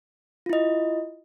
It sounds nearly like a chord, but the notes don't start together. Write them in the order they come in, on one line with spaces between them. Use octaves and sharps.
F4 E4 D#5